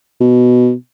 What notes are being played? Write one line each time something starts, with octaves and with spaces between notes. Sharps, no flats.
B2